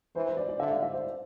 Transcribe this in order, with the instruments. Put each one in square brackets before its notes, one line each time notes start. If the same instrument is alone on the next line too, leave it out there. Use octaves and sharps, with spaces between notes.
[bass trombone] E3 [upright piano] C5
[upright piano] C5
D5
D5
[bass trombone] D3 [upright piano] E5
[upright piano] F5
E5
C5